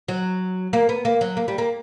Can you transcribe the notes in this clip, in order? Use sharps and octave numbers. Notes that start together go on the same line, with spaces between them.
F#3
A#3
B3
A#3
F#3
A#3
G3
A#3